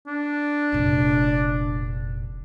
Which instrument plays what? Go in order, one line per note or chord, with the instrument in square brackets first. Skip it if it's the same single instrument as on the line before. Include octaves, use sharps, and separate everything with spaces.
[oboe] D4
[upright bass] F1 A#1